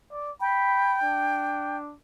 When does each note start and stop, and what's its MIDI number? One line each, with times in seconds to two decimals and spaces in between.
0.11 0.31 74
0.41 1.77 79
0.41 0.98 83
1.02 1.94 62